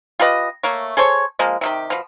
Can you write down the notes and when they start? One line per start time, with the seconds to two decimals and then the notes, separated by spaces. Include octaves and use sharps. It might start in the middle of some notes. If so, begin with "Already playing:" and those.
0.20 F4 G4 B4 D#5
0.63 A3 A#3 C#5
0.97 G#4 A4 C5 C#5
1.39 F3 G#3 A#3
1.61 C3 D#3 G4
1.90 B2 F3